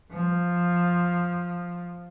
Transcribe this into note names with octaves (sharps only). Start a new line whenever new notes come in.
F3